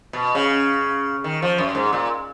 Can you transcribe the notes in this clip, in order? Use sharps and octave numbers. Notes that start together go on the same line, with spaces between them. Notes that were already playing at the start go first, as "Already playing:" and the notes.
B2
C#3
D#3
F3
F#2
G#2
A#2